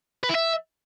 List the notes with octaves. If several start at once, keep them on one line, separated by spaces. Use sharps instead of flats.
B4
E4
E5